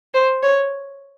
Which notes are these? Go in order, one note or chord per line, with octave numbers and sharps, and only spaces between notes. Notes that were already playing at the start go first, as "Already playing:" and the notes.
C5
C#5